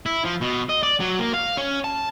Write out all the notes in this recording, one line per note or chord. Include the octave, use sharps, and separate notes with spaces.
E4
F3
B2
D#5
D5
F#3
A#3
F5
C#4
A5